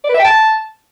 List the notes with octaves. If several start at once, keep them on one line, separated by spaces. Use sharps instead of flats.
D5
B4
E5
G5
A5